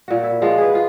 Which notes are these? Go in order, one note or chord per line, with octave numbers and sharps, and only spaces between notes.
A#2 F#4
E4
F3 G#3 F4 F#4
G#4 B4
B3 F4